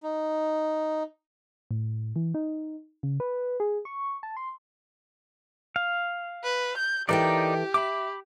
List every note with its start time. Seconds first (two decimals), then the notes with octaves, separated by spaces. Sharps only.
0.03 D#4
1.71 A2
2.16 E3
2.34 D#4
3.03 C#3
3.20 B4
3.60 G#4
3.85 C#6
4.23 A5
4.37 C6
5.76 F5
6.44 B4
6.78 G6
7.09 E3 D#4 G4 A4 A#4 D5 G5
7.74 E5 B5 D6